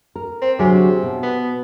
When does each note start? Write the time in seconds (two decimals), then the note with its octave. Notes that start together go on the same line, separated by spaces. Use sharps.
0.15 A#4
0.42 C4
0.59 D2 C3 F#3 G#4
1.03 B2
1.23 B3